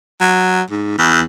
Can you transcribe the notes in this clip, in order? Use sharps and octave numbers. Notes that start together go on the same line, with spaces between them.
F#3
G#2
E2